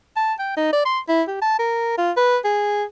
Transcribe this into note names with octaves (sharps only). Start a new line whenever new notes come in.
A5
G5
D#4
D5
C6
E4
G4
A5
A#4
F4
B4
G#4